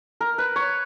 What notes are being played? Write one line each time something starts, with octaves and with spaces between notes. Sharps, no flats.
A#4
B4
C#5